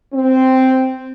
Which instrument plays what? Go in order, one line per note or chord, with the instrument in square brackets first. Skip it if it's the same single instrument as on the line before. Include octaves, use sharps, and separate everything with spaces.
[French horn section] C4